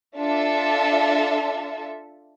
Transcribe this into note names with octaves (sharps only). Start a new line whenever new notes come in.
D4 F4 A4 E5